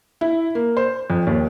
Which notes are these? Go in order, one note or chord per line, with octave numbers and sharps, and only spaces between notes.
E4
A#3
C5
F2
D#2